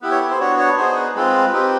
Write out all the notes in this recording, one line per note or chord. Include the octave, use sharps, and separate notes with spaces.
B3 E4 G4 B4
C#5
A4
C5
B3 D4 F#4 C#5
C#5
B3 D#4 G#4 C5
B4
G#3 C4 F4 B4
C4 D#4 G4